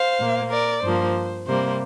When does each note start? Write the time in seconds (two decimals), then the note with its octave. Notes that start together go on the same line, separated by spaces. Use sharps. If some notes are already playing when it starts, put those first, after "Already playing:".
Already playing: C5 F5
0.19 A#2 A#3
0.51 A#4 D5
0.83 G2 F3 A#3 C5
1.46 C3 G3 A#3 C5